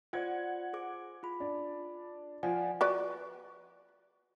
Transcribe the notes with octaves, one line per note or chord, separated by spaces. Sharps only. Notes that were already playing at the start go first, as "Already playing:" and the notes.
F4 C5 D5 F#5 G#6
G#4 C5 D6
F4 G#4 B5
D4
F3 D5 F#5 G#5
F#4 B4 D5